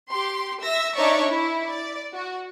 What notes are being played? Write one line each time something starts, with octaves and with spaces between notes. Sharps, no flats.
G4 C6
E5 E6 A#6
D4 D#4 C#5 D5 E5 C#6
E4
D5
F#4